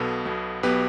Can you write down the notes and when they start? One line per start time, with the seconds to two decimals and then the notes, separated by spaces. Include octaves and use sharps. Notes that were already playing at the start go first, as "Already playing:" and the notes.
Already playing: B1 B2 B3 A4
0.25 B1 B2 B3
0.63 B1 B2 B3 G4 B4